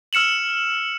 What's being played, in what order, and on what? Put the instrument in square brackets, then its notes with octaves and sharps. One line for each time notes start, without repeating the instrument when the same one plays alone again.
[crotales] E6 F6 C#7 E7 F#7